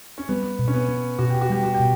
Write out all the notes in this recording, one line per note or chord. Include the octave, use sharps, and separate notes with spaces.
C#4
G3 B3
B2
C#4
B3
C#4
B2 F#4
G4
F#4
G3 G4
F#4
G4
B2